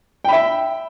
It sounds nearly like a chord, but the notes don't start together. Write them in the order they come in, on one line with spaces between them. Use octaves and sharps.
G5 B5 E5